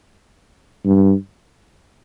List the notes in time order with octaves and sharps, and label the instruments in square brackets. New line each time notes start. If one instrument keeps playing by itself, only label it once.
[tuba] G2